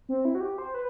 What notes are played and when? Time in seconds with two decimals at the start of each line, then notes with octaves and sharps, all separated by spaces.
0.09 C4
0.25 E4
0.35 F#4
0.41 G4
0.58 C5
0.74 B4